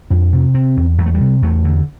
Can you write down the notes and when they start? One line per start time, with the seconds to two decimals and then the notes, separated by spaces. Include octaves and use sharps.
0.10 F2 D4
0.33 C3
0.54 C3 C4
0.77 E2
0.98 E2 G3
1.06 A3
1.14 G3
1.21 C3
1.42 E2 A3
1.64 D3